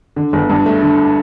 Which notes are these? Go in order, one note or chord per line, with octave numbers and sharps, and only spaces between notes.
D3
G1
G2
A3
D3